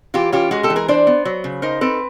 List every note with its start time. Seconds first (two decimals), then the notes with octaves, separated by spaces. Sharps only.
0.14 E3 F4 G4
0.32 C#4 F4 G4
0.51 G#3 F#4 G#4
0.63 G4 A4
0.70 E3
0.76 G#4 A#4
0.88 D4 C5 D5
1.07 B3
1.25 F#3
1.44 C#3
1.62 D#4 A#4 C5
1.81 C4 A4 B4